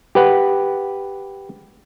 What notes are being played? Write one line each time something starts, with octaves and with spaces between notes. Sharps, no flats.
G4 B4 F#5